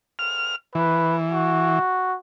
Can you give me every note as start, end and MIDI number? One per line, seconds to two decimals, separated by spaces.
0.19 0.56 89
0.75 1.79 52
0.75 1.16 71
1.34 2.17 66